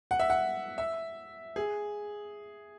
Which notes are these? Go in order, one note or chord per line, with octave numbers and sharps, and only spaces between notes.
F#5
E5
F#5
E5
G#4